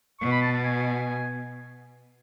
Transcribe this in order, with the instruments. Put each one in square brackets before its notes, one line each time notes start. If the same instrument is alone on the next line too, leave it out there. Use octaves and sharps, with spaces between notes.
[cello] B2 [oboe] C#6
[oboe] B5
A5
A5
G#5